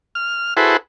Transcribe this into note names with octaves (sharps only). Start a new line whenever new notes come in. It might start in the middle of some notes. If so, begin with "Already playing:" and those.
F6
E4 F#4 G#4 A4 B4 C5